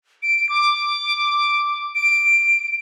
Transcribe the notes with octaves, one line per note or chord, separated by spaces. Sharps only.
D7
D6
D7